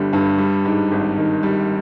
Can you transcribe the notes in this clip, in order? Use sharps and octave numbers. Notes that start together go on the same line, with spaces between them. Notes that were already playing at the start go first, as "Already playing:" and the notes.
Already playing: G1 G2 D3 G3
G2
G3
G#2
G#1
D#3
G3